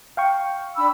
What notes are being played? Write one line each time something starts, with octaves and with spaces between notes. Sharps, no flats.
F5 G5 C#6
D4 B5 E6